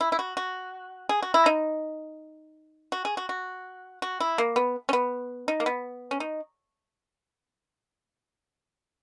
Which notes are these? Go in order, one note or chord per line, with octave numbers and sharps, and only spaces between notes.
E4
E4
F#4
F#4
G#4
F#4
E4
D#4
F#4
G#4
F#4
F#4
F#4
E4
A#3
B3
C#4
B3
D#4
A#3
B3
C#4
D#4